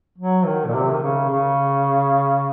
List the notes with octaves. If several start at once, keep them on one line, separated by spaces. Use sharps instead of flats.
F#3
D#3
A#2
C3
D#3
C#3
C#3